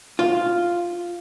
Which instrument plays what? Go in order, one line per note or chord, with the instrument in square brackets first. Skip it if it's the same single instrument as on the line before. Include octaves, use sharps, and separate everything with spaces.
[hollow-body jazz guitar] F4